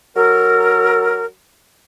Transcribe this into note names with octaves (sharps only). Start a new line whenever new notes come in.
F#3 A4 A#4